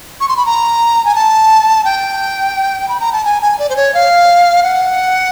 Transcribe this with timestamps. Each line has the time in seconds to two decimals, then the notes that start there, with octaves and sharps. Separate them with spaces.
0.20 C#6
0.29 C6
0.37 B5
0.46 A#5
1.05 G#5
1.15 A5
1.85 G5
2.88 B5
3.00 A#5
3.13 A5
3.25 G#5
3.42 G#5
3.59 D5
3.69 C5
3.76 C#5
3.94 F5
4.63 F#5